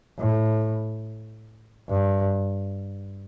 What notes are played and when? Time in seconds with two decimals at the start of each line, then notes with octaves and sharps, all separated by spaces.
0.19 A2
1.89 G2